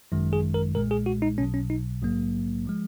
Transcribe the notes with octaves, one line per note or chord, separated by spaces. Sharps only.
G#1 F#2 D#3 G#3
G#4
A#4
B1 A#2 G#3 A#4
G#4
F#4
D#4
B1 B2 F#3 C#4
C#4
D#4
A#1 G#2 F#3 A#3
F3 G#3